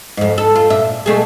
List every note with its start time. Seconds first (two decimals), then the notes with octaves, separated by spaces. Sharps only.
0.17 F2 G#2
0.38 A4
0.55 F4
0.70 A#2 E5
1.06 B2 A3 G#4